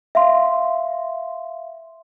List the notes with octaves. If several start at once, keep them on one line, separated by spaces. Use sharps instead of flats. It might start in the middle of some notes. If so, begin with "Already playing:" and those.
E5 F5 C6